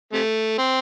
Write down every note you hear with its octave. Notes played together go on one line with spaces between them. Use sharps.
C3 A3
C4